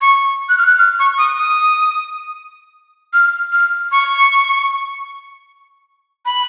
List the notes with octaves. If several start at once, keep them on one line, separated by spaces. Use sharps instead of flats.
C#6
F#6
F6
F#6
F6
C#6
D#6
D#6
F6
F6
C#6
B5